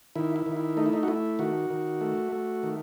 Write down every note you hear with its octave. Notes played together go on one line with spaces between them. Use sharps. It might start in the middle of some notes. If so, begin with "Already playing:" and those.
D#3 E4
E4
D#3
E4
A3 D#4
E4
D#4
F#4
A3 E4
D#3 F#4
D#3
A3
A3
D#3